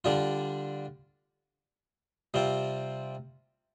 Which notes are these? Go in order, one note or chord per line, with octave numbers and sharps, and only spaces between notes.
D3 G3 D4 F4
C3 G3 C4 F4